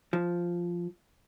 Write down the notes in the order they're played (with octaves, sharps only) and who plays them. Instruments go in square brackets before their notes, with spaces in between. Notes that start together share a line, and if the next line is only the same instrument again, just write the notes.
[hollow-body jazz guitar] F3